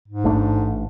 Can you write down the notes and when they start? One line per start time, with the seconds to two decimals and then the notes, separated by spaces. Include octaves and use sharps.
0.08 G#2
0.24 A1 A3 D4